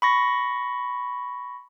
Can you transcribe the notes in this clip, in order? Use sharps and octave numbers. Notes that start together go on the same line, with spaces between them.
B5 C#6 A#6